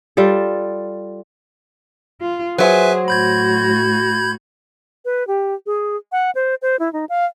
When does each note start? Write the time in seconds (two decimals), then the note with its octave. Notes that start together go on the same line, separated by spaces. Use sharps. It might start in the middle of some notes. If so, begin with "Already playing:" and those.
0.17 G3 F4 A4
2.21 F4
2.58 F#3 G#4 B4 C5 E5 G#5
3.08 A2 F#4 B5 G6 G#6
5.05 B4
5.27 G4
5.66 G#4
6.12 F#5
6.35 C5
6.62 C5
6.79 E4
6.93 D#4
7.09 F5